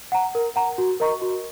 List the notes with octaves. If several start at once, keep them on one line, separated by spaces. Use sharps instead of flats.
F#5 A#5
A#4
F#5 A#5
F#4
A#4 D#5 A#5 C#6
F#4